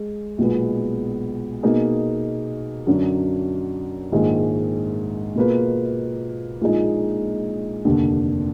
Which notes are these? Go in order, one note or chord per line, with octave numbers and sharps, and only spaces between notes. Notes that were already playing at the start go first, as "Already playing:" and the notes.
Already playing: G#3
B1 A#2 G#3 B3
B2 A#3 D#4 G#4
F#2 D3 F#3 D4
A#1 G#2 D#3 G#3
B2 A#3 F4 G#4 B4
A#1 A#2 F3 G#3 D#4
F1 D#2 D3